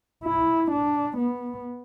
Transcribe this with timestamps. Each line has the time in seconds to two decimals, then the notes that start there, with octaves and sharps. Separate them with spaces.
0.24 E4
0.71 D4
1.17 B3